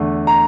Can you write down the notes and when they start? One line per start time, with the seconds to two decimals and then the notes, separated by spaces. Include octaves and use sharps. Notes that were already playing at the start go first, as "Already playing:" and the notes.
Already playing: E2 D3 A3
0.27 A#5